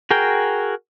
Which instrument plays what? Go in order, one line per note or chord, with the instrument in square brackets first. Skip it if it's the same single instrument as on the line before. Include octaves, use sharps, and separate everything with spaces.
[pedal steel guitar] F#4 G#4 A#4 G5